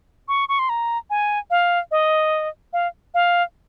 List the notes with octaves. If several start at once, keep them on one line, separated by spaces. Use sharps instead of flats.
C#6
C#6
C6
A#5
G#5
F5
D#5
F5
F5